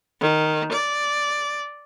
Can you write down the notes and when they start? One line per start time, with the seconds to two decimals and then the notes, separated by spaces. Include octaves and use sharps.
0.21 D#3
0.72 D5